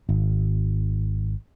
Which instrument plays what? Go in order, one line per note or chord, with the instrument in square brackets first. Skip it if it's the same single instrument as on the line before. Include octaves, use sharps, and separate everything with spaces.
[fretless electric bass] G#1